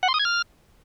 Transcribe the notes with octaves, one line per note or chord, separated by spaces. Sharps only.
F#5
C6
D#6
G#6
F6